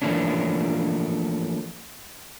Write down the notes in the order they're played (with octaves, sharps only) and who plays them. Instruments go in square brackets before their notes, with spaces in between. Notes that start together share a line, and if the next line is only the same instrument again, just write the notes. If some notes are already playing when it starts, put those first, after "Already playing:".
[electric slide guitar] E3 F3 A3 A#3 C#4 D4